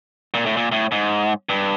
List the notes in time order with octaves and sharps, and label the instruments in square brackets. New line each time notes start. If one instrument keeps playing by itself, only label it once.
[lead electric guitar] A#2
A2
A#2
A2
G#2
G2